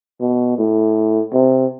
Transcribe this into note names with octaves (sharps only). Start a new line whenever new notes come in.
B2
A2
C3